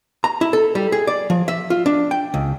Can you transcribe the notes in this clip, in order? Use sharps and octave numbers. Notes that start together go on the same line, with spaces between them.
A#5
E4
A4
G3
G#4
D5
F3
E5
F4
D4
G5
C#2